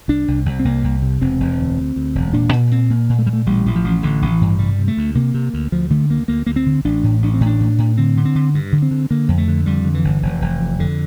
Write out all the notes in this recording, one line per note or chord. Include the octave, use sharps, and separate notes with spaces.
C2 D4
C2
C2
C4
C2 A#3
C2
C3
E1 C4
E1
D2
D2
D2
E1
A#2 D4
A#2
A#2 C4
A#2 A#3
A#2
A3
A#2 G3
A3
A1 G3
A1
F3
A1
A1 D3
A1
E3
G2
C3 G3
C3
A3
D2
C3 A#3
C3
D2
D2 F3
D3 A3
D2 A#3
D2 A#3
D2 A#3
C4
D3
A1 D4
A2
A1 D4
C4
A2
D4
A2
A2
D3 C4
D3
C4
D3
G2
D3
C4
D3
D3 A#3
F2
A3
D3
F2 G3
D3
E3
G1
F1
F1
F2
F2 D3